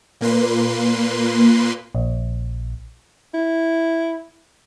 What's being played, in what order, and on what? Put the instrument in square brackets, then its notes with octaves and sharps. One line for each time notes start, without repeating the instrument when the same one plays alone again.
[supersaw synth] A#2 A#3 B4 C6
[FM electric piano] A#1
[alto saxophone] E4